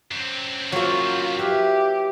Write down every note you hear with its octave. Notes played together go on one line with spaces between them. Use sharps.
F#2 C4
F#3 A#3 F4
E4 G4 B4 F5